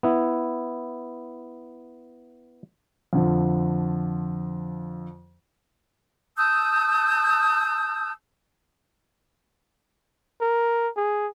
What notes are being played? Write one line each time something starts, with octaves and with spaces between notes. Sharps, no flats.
B3 E4
F2 D3 F3
A5 D#6 E6 G6
A#4
G#4